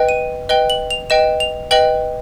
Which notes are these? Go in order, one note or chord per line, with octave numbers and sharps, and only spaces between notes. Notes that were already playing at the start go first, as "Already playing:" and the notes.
Already playing: B4 D#5 G5
D#7
B4 D#5 G5 G7
F#7
F7
B4 D#5 G5 E7
F7
B4 D#5 G5 F#7